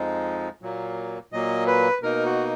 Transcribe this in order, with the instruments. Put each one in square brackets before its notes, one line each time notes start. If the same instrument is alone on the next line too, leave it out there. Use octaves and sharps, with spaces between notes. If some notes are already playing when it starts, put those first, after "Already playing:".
Already playing: [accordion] F2 F3 G#3 D#4
A#2 F#3 A#3
A#2 F#3 A#3 D#5
B4
B2 A#3 D#4 A#4
F#4